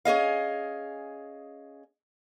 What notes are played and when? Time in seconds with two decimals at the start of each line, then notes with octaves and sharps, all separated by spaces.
0.05 C#4 G#4 D#5 F5